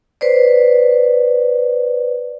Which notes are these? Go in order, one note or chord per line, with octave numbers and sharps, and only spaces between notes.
B4 C5 D5